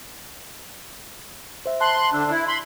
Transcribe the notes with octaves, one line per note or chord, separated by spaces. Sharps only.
C5 E5
A5 B5 C6 F#6
E5
D3 D4 E6 F#6
E4
B5 C6